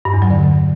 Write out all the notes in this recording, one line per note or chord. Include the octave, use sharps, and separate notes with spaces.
G2
E2
F#3
D3